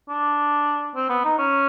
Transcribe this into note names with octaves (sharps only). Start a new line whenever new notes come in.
D4
C4
B3
D#4
C#4